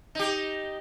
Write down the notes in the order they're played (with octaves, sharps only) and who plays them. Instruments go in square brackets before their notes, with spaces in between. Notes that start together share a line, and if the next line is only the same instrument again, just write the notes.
[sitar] D#4 G4